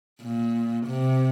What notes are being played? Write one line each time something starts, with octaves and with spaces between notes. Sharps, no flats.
A#2
C3